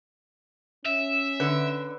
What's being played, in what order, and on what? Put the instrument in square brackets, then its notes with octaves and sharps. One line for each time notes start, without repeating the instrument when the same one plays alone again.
[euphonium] C#4 [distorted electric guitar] E5
[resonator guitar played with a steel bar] D3 [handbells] B4